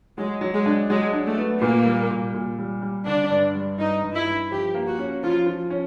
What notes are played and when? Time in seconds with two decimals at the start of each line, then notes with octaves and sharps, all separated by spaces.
0.17 F#3 G#3
0.41 F#3
0.54 G#3
0.66 D4
0.90 F#3 G#3
1.13 D4
1.26 A3
1.38 B3
1.62 A#2 A#3
1.86 G3
2.11 A#2
2.34 A#2
2.59 G3
2.82 G3
3.06 D3 D4
3.30 G2
3.54 G3
3.78 G2 D#4
4.03 G2
4.14 E4
4.27 G2
4.51 F3 G4
4.75 A#3
4.87 F#4
4.99 C#4
5.23 F3 F4
5.46 F3
5.70 C#4